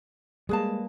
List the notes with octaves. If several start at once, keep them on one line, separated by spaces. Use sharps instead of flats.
G3 G#3 A#3 G#4 B4 A5